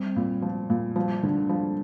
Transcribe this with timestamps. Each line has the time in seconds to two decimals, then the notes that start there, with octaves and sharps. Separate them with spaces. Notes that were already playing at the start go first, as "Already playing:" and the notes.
Already playing: G3 C4
0.16 A#2
0.42 F3
0.70 A#2
0.96 F3 G3
1.23 D3
1.49 F3